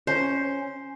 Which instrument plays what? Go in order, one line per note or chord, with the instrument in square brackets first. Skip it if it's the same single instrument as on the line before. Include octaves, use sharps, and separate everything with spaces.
[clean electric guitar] C#4 [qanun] C5